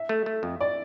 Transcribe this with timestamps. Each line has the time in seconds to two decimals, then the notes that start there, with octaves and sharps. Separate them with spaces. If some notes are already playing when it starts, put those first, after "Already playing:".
Already playing: E5
0.09 A3
0.26 A3
0.43 F2
0.60 D5